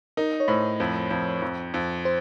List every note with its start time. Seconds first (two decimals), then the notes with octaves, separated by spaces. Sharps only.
0.17 D#4 A#4
0.40 C#5
0.48 A2 C5
0.80 F2 C5
1.11 F2
1.42 F2
1.74 F2
2.05 C5